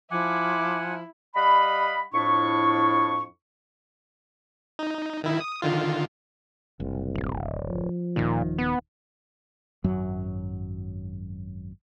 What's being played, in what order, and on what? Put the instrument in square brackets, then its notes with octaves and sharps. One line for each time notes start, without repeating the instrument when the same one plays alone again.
[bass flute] F3 [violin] E4 [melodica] F#5 G#5 [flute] D6
[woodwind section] G3 D#5 F5 F#5 B5
F2 A2 D4 E4 C#6
[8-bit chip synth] D#4
D#3 E4
D#6
D3 D#3 F4
[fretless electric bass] F#1 [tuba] C2
[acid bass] D1
[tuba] F3
[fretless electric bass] D#1 C2 D#3 [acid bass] A#2
[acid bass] B3
[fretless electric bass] G#1 F#2 F#3